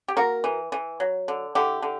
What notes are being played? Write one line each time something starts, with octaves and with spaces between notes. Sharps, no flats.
G4
A#3 F#4 A#4
E3
E3
F#3
D3
D3 E4 G4
D3